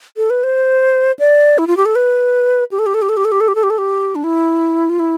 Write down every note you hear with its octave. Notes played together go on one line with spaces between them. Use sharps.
A4
B4
C5
D5
E4
F4
G4
A4
B4
G4
A4
G4
A4
G4
A4
G4
A4
G4
A4
G4
A4
G4
A4
G4
D4
E4
F4
E4